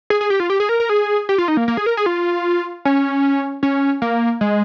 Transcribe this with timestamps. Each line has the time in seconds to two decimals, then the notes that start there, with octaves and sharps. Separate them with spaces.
0.10 G#4
0.21 G#4
0.30 G4
0.40 F4
0.50 G4
0.60 G#4
0.69 A#4
0.80 A#4
0.89 G#4
1.29 G4
1.38 F4
1.48 D#4
1.57 A#3
1.68 A#3
1.77 G#4
1.86 A#4
1.97 G#4
2.06 F4
2.85 C#4
3.63 C#4
4.02 A#3
4.41 G#3